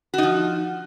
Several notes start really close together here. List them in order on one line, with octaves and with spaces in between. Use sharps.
F#4 D#4 F3